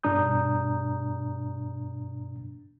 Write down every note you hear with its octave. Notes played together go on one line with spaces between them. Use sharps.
G2 B2 D4 A#5 D#6 G6